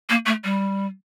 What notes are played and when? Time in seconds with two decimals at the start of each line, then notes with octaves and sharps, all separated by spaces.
0.09 A#3
0.26 A3
0.44 G3